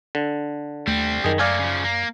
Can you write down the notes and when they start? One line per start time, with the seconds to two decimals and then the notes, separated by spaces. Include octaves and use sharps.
0.15 D3
0.87 D#2 G3 A3 C4
1.24 F#2 D#3 G#4
1.39 A3 A#3 D5 F5 G#5
1.59 C#3 F3
1.84 A#3